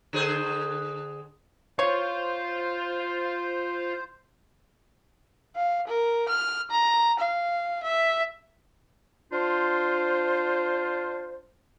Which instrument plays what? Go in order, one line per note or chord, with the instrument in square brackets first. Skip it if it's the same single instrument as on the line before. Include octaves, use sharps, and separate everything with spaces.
[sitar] D3 G#4 C5
[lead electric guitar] F4 F5 [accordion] C5 [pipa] C#5
[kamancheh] F5
A#4
F6
A#5
F5
E5
[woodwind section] D4 F4 C5